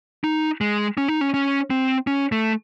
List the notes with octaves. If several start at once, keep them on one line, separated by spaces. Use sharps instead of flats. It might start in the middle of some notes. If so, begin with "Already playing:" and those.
D#4
G#3
C#4
D#4
C#4
C#4
C4
C#4
A3